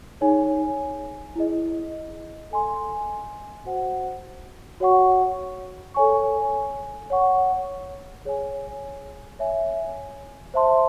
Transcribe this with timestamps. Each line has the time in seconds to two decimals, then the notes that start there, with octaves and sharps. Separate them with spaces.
0.21 D#4 G#4 C#5 G#5
1.36 E4 G#4 D#5
2.51 A4 D#5 G#5 C6
3.65 F#4 C5 F#5
4.80 F#4 C#5 F#5 C#6
5.94 A4 C#5 G#5 C#6
7.10 C#5 F#5 C#6
8.25 G#4 C#5 G#5
9.39 C#5 E5 G#5
10.54 C5 E5 A5 C6